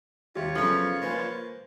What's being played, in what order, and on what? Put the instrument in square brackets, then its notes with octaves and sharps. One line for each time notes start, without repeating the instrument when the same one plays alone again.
[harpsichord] D#2 C3 [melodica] F4 C#5 [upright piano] G4
[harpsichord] F#2 B3 C#4 [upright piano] C#3 A4 [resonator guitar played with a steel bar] F3
[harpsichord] A#3 [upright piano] B4 C5 G#5